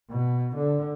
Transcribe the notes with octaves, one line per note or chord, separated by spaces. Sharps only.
B2
D3